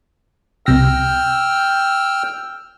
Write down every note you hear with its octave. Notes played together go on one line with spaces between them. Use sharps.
C2 C3 G5 E6 F6 A#6